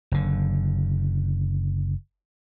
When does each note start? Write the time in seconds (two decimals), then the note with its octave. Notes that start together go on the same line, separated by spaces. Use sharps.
0.12 F#1 D3